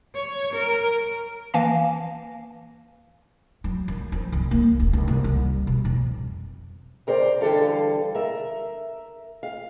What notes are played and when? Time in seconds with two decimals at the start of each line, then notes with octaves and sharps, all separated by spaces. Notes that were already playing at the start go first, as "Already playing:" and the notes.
0.16 C#5
0.54 A#4
1.54 E3 A#3 F5 G#5 A5 A#6
3.64 F#3
3.88 F#2
4.12 F3
4.32 C2
4.51 A#3
4.79 D#1
4.93 C#2
5.08 C2
5.24 G3
5.67 B2
5.85 F2
7.07 D2 A#4 C5 D5
7.41 D3 E3 G3 A4 F5
8.15 A#4 E5
9.43 F5